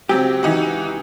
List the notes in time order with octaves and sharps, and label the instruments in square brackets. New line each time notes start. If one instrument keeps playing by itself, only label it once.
[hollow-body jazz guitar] C#2 G4 [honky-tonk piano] F#3 C4
[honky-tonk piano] E3 D#4 F#4